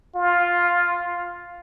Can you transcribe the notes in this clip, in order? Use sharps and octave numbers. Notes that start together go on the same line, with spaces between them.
F4